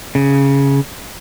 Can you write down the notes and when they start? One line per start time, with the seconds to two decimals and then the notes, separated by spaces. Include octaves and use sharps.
0.15 C#3